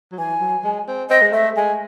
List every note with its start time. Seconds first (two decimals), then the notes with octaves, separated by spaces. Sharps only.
0.12 F#3
0.18 E3 G#5
0.41 F#3
0.64 G#3
0.88 C4
1.10 C4 D#5
1.22 G#3
1.33 A3 E5
1.56 G#3 G#5